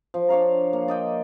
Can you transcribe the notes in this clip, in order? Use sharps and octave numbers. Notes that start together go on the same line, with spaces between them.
F3
D4 C#5 F5 A#5
A#3
D5 D#5 G5